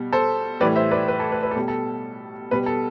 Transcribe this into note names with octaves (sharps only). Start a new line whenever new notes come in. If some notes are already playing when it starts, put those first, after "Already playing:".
Already playing: B2 G3
A4 C5
A2 E3 G3 B4 D5
C5 E5
B4 D5
B4
A4
B4
B4
A4
B2 G3
A4
B2 G3 B4
A4